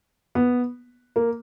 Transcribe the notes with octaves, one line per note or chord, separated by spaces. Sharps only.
B3
A#3